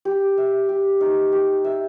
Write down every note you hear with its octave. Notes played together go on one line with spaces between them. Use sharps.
G4
E5
G4
D#4
G4
E5